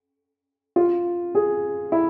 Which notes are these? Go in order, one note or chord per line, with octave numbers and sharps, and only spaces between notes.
F4
G#4
E4